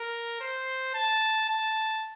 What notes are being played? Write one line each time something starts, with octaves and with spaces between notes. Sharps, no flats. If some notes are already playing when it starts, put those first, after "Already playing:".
Already playing: A#4
C5
A5
A5